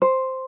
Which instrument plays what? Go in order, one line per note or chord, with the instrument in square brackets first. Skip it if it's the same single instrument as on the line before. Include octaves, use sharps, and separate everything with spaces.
[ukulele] C5